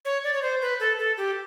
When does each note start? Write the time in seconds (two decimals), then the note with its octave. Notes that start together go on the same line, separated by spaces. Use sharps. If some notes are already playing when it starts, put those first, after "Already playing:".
0.05 C#5
0.24 D5
0.33 C#5
0.42 C5
0.61 B4
0.80 A4
0.99 A4
1.17 G4